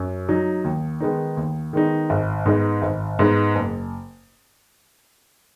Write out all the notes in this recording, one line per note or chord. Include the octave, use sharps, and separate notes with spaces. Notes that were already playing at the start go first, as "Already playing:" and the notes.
Already playing: F#2
F#3 D#4
D#2
D#3 G#3 B3 D#4
D#2
D#3 G#3 B3 D#4
G#1
G#2 G#3 B3 D#4
G#1
G#2 G#3 B3 D#4
F#1